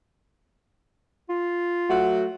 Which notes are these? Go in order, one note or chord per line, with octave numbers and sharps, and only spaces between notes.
F4
F#3 A3 F#4